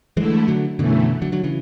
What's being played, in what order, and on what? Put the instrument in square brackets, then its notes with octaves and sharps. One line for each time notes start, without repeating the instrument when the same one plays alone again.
[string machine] D3 A3 E4 [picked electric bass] E3 G#3
[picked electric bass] D3 F#3
[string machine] F#2 E3 A3 [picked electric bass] B2 D3
[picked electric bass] D3 F#3
D3 F#3
C#3 E3